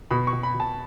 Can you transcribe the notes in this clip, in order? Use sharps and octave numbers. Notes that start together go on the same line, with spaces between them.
B2 B5
C#6
B2
B5
B2
A5